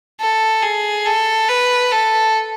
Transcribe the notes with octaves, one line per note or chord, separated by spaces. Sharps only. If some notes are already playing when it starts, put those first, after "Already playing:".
A4
G#4
A4
B4
A4